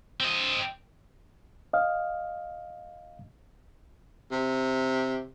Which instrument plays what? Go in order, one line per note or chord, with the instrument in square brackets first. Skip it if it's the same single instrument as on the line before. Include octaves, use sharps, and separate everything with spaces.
[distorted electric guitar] C4 D#5
[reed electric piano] D#5 F5
[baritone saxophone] C3